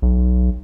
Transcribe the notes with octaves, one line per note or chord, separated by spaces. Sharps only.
B1